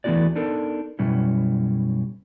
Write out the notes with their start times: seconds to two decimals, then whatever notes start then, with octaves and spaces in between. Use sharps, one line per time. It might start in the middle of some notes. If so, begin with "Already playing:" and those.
0.04 E3 A3 B3 E4 F#4 D5
0.35 B3 D4 D#4 A4 A#4
0.99 F#2 B2 G3 C#4 E4